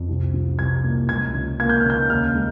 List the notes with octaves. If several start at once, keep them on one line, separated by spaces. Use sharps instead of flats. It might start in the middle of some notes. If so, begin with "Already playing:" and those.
Already playing: F2
C2
F3
C2 G#6
A#2
C#2 G#6
F3
A#3 G#6
G6
C#3 F6
G6
D#2 F6
G#3